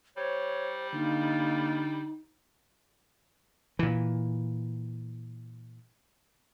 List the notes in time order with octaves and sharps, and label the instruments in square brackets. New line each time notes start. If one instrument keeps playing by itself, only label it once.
[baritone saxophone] G3 [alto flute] C5 [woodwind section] C#5
[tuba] D3 [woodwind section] A#3 F4 [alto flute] D#4
[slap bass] A#2 E3